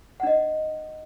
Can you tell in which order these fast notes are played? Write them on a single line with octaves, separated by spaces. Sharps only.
F#5 D4 D#5